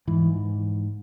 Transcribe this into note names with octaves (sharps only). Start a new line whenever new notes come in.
G#2 E3